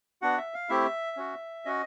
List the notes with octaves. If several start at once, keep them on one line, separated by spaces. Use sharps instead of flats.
B3 D4 F#4 F#5
E5
F5
A3 C4 E4 G4 E5
C#4 F#4
C#4 F#4 D#5